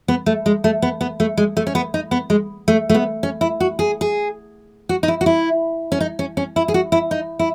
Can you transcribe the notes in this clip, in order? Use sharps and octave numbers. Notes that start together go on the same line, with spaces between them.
B3
A3
G#3
A3
B3
B3
A3
G#3
A3
C#4
B3
D#4
B3
G#3
A3
A3
B3
C#4
E4
F#4
G#4
G#4
F#4
D#4
E4
F#4
E4
C#4
D#4
C#4
C#4
E4
G#4
F#4
E4
D#4
E4